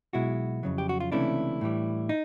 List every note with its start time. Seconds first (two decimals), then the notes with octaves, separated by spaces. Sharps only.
0.13 B1 B2 G#3 E4 F#4
0.63 F2 C#3 F#3
0.78 G4
0.89 F#4
1.00 F4
1.12 C#2 C3 E3 A3 C#4 D4 E4
1.61 A2 E3 G3
2.09 D#4